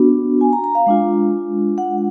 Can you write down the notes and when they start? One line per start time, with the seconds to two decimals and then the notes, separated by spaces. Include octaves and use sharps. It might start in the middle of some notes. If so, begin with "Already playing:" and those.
Already playing: B3 D4 F#4
0.41 G#5
0.53 A#5
0.64 A#5
0.75 F5
0.86 G#3 D4 F4
1.78 F#5